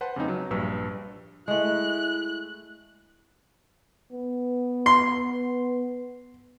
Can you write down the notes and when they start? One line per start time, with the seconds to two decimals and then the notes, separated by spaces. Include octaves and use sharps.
0.01 B4 C5 F#5 A5 C6
0.16 F2 C#3 G#3 C4 D#4
0.28 F#3
0.51 A#1 G2 B4 E6
1.48 G#3 A3 E4 F#6
4.12 B3
4.86 C6